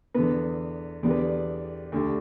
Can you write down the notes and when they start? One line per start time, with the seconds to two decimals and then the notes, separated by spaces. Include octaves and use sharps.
0.14 E2 D3 B3 B4
1.03 E2 D3 G3 B3 D5
1.10 B4
1.19 D5
1.92 D2 D3 G3